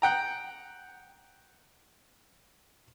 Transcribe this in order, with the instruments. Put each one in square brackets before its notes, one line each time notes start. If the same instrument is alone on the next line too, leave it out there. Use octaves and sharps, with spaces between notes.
[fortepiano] F#5 G5 A#5